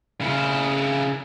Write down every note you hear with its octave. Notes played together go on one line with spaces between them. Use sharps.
C#3 E4